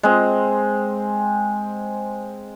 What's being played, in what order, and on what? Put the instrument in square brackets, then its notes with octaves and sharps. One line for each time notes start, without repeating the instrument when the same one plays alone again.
[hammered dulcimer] G#3 C4